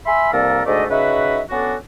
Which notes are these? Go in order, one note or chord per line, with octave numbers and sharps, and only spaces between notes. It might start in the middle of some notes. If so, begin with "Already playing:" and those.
E5 G#5 B5 C6 E6
C2 A#3 A4 A#4 D5
D2 G#2 A3 D5 D#5
C#3 D#4 F#4 B4 E5
B3 C#4 D4 F#4 A4